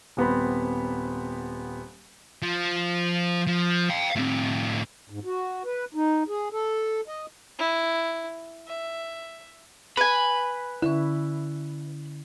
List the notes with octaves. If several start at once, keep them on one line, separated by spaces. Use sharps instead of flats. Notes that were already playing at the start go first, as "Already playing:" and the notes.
D#1 B3 C4 B5
F3
F3
F5 G5
A2 C4
G#2
F#4
B4
D#4
G#4
A4
D#5
E4
E5
B4 G#5 B5
D3 C#4 E4